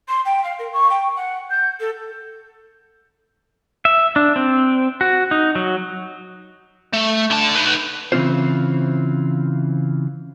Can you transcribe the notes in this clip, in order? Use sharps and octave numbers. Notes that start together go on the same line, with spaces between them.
C6
G5
F5
A#4
C#6
G5
F#5
G6
A4
E5
D4
C4
F#4
D#4
F#3
A3
D3 A5
D#4 B4
C#3 E3 C4 C#4 F4 C5